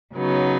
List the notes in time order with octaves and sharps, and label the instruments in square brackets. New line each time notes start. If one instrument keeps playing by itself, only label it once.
[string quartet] C#3 F#3 B3 D#4